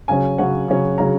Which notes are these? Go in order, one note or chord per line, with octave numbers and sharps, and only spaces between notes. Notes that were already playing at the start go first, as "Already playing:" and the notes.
C#3 F#3 C#4 G#5
C#3 F#3 C#4 F#5
C#3 F#3 C#4
C#3 F#3 C#4 A#5